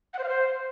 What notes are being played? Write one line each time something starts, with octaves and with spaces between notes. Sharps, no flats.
F#5
C5
F5
C5